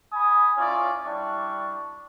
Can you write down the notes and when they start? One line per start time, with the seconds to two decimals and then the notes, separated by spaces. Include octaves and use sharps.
0.13 G#5 B5 D#6
0.57 C#4 E4 F4 C#5 D5
1.06 G3 D4 E4 D5 C#6